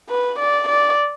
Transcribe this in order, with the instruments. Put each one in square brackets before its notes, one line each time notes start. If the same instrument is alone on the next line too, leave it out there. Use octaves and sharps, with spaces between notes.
[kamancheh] B4
D5
D5